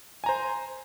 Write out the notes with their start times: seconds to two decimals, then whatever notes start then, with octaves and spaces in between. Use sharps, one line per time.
0.24 G#5
0.26 A#5
0.29 C5